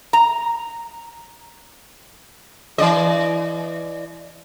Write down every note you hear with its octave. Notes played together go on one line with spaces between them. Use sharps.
A#5
E3 D5 D#5